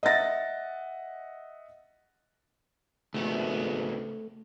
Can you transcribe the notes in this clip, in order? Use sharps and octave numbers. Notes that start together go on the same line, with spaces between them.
D#5 E5 F#5 A6 A#6
G#1 C#2 A3 B3